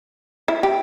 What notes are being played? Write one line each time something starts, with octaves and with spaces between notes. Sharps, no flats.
E4
G4